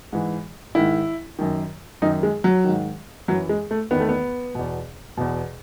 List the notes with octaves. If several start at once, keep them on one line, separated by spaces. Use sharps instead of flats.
G#2 E3
G#2 D#3 E4
F#2 D#3
F#2 D#3 D#4
G#3
F#3
G#2 D#3
F#2 E3 F#3
G#3
A3
E2 D#3 B3
A3
B3
E2 B2
E2 B2